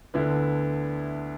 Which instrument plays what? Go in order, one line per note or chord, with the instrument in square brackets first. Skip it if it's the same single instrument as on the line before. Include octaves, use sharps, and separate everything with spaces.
[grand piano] D2 D3 B3 E4